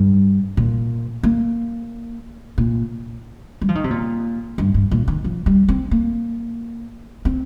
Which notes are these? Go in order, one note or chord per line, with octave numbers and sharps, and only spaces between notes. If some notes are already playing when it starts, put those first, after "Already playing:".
Already playing: G2
A#2
A#3
A#2
G3
F3
D#3
C3
A#2
G2
G2
A#2
D#3
F3
G3
C4
A#3
C4